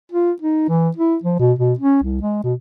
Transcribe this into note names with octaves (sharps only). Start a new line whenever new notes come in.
F4
D#4
E3
E4
F3
B2
B2
C#4
C2
G#3
B2